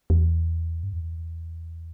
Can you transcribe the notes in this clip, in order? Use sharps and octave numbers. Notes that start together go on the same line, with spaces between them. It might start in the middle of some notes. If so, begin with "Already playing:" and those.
E2
G2
E2